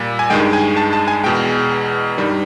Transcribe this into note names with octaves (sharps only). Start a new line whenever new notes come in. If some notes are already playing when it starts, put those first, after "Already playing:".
Already playing: A#2 G3
G#5
G2 D#3 G#3 G5
G#5
A5
A5
G#5
E2 B2 G#3 G5
G2 D#3 G3